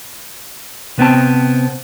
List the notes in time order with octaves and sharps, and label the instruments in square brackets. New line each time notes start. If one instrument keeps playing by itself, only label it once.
[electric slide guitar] C3 B3 C4 A5